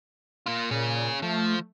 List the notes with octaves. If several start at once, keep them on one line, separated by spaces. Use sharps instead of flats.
A#3 F4
A#2 C#4 G#4
F3 A3